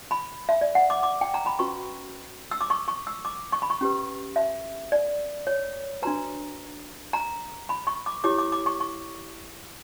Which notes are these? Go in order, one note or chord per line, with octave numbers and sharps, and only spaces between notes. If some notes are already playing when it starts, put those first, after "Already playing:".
B5
E5
D5
F#5
D6
D6
G5
A#5
B5
C#4 F#4 B4 C#6
E6
D6
C#6
C#6
E6
D6
C#6
B5
C#6
C#4 G4 B4
E5
D5
C#5
D4 F#4 B4 A#5
A#5
B5
C#6
D6
E4 G4 C#5 D6
D6
D6
C#6
C#6